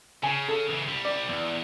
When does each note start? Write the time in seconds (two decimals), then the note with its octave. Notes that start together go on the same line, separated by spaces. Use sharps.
0.23 C#3 G#5
0.48 A4
0.70 C#3 E3
0.88 C2 G3
1.05 D5
1.29 E2